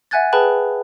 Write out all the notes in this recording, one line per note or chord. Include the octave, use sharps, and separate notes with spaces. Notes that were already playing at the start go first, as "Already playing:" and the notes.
E5 F#5 G#5 F#6 G#6 A6
G#4 B4 G5 A5 B5 F#6